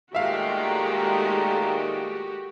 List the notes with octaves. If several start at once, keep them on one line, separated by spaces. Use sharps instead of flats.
A#2 D#3 G#3 A3 F#4 G4 E5 F5